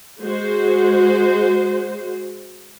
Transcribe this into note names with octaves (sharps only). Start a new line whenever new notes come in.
G#3 F#4 C5